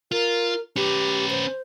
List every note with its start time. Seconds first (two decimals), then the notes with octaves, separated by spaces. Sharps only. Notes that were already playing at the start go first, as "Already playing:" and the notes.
0.12 F4 A#4
0.76 C#4 G4 B4
1.30 C5